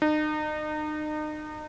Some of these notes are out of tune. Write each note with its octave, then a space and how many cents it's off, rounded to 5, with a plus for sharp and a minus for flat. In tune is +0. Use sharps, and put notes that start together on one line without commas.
D#4 -35